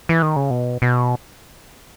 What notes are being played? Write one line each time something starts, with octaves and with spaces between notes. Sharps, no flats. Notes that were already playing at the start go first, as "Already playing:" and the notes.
E3
D#3
C#3
B2
B2